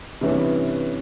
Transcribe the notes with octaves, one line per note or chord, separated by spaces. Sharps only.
G2 C3 E3 C#4